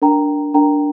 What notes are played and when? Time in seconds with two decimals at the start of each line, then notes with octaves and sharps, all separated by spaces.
0.02 D4 A#4 G5 A#5
0.54 D4 A#4 G5 A#5